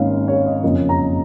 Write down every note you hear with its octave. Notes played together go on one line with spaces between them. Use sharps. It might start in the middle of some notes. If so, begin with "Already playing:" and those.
Already playing: G#1 G#2 D#3 A#3 C#4 F5
C#5
D#5
F#1 F2 F3 A#3 C#4 D#5
A#5